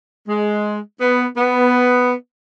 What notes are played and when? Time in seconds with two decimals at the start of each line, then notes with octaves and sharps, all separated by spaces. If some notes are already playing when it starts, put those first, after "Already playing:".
0.28 G#3
1.01 B3
1.37 B3